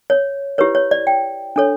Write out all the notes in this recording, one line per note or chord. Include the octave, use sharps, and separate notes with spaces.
C#5
E4 G4 B4 C#5
C#5
D5
G5
D4 A4 C#5